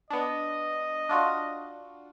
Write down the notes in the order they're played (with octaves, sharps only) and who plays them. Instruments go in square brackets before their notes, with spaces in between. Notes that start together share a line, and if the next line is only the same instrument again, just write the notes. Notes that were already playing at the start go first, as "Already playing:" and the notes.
[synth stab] B3 D4 [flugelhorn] D#5
[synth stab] D4 F4 F#4